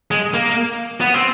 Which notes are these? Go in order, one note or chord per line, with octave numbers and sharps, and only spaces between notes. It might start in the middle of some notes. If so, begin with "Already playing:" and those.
G#3
A#3
B3
C4